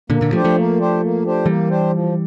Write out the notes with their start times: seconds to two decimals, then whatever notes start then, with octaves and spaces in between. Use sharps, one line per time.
0.10 A#2 D3 A#3
0.21 A#2 D3
0.32 F3 A3 D4 G4 C5
0.45 F3 A3
0.56 A#3
0.78 D4 G4 C5
1.01 A#3
1.24 D4 G4 C5
1.46 E3 G3 A#3
1.69 D4 G4 C5
1.92 F3